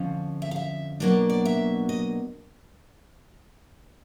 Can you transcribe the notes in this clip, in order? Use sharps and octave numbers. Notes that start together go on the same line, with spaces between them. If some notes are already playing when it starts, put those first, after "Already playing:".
Already playing: F2 D3 F3 C#4
E5
F5
E5
B2 F#3 A#3 D4
D5
E5
D#5